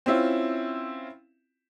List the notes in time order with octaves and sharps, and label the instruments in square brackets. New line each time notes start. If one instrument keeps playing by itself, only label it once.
[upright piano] C4 C#4 E4 F4